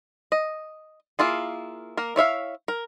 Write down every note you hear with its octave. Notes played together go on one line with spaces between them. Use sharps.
D#5
A#3 E4 F4 G#4
A#3 A#4
E4 C#5 E5 F5
A#4